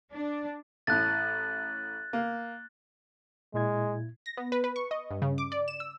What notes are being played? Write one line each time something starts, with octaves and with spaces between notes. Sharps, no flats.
D4
A1 A2 F#6 A6
A#3
A#2 G#3 E4 G#6
A#6
B3
B4
B4
C#6
D#5
G2
C#3
D6
D5
E7
E6